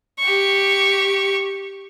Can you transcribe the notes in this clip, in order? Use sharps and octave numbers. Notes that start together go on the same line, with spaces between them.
G4 C#6